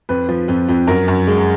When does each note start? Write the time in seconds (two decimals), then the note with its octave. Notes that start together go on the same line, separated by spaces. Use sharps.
0.09 F2 B4
0.29 F3
0.48 F2
0.69 F2
0.87 F#2 A#4
1.08 F#2
1.27 G#3